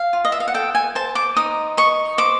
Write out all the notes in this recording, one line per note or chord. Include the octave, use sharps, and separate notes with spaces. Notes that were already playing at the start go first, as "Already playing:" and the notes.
Already playing: F5
F4
D#5
E5
F5
F#5
A4 G5
G#5
C5 A5
D6
D#4 D#6
D#5 C#6
C5 D6